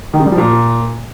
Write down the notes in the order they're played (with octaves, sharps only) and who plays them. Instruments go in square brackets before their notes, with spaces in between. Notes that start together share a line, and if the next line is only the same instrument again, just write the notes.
[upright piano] D#3
C#3
G3
F3
A#2